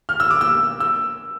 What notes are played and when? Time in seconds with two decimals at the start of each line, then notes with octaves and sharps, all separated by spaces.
0.09 F6
0.20 E6
0.31 D6
0.41 E6
0.80 E6